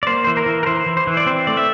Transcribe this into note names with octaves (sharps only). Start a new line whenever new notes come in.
D5
A#3 C5
E3 C5
A#4
E3
A#4
E3 C5
E3
C5
E3
D5
C4 C5
A3 D5
E5